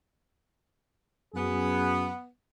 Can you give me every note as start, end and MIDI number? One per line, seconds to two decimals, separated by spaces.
1.35 2.09 42
1.35 2.28 59
1.35 2.09 68